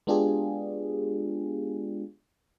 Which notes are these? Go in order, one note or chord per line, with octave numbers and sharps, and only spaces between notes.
G#3 B3 D4 F4 G4 G#4